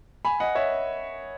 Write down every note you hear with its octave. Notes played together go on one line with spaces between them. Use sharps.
G#5 B5
D#5 F#5
C#5 E5